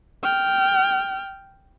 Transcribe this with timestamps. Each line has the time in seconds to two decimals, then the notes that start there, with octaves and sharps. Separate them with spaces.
0.24 G5 F6